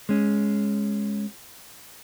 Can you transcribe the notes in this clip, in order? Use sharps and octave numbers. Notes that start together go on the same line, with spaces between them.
G#3 C#4